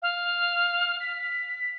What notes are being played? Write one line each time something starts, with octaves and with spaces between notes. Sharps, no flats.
F5
B6